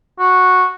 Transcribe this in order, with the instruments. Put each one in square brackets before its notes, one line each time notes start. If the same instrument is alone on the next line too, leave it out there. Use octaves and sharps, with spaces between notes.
[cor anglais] F#4